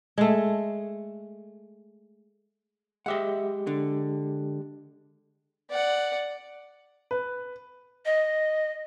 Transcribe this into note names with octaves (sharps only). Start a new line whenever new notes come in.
G#3 A3
G#3 G4 D#5 E5 F#5
D3
D5 F#5
B4
D#5